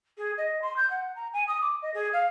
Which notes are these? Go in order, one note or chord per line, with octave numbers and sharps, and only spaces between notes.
G#4
D#5
C6
G6
F#5
A#5
G#5
D#6
D6
D#5
G#4
F5